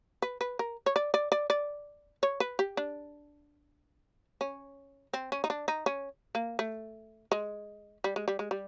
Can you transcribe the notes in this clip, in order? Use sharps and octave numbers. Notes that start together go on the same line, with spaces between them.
B4
B4
A#4
C#5
D5
D5
D5
D5
C#5
B4
G4
D4
C#4
C4
C#4
D#4
D4
D#4
C#4
A#3
A3
G#3
G3
G#3
G3
G#3
G3